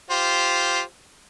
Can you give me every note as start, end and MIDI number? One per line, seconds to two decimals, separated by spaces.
0.10 0.81 65
0.10 0.81 67
0.10 0.81 72